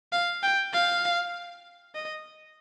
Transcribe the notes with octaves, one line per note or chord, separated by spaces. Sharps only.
F5
G5
F5
D#5